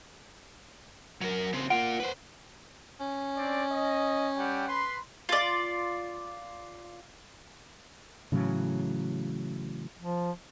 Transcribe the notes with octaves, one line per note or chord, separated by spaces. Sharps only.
F#3 A#4
C#3 C4
A#3 F4 F#5 D7
B4 C5
C#4
C4 D4 D5
D#5
G3 F#5 G5
B4 B5 C6
F4 D5
A2 C#3 E3 F#3
F3